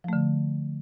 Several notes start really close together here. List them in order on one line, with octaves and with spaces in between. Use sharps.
F3 A3 D3